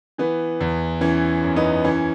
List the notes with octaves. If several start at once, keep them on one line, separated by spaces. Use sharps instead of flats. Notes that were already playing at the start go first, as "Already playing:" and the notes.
E3 B3
E2
E3 C#4
F#2
B3 D#4
E3 C#4